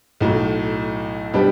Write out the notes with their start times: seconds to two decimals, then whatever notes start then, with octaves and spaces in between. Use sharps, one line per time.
0.21 B1 A2 F#3
1.34 B2 G3 B3 D4 G4